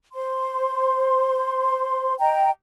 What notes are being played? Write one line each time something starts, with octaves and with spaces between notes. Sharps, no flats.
C5 C6
D#5 G5 A#5